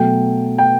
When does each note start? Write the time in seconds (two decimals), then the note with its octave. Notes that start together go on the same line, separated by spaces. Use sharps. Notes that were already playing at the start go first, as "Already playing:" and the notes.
Already playing: B2 F#3 A3 G5
0.58 G5